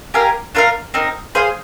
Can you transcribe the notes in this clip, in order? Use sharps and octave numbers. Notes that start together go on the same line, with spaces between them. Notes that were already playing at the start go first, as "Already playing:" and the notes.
G4 A#4 F5 G#5
D4 F4 A#4 F5
C4 D#4 A#4
G#4 C5 F5 G#5